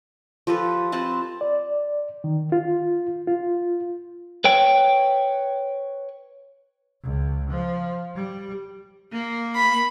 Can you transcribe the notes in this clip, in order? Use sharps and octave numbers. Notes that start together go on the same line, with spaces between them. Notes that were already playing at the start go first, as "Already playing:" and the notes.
F3 G4 A4 B4
C4 B4 A5
D5
D#3
F4
F4
B4 C#5 G5
C#2
F3
G3
A#3
B5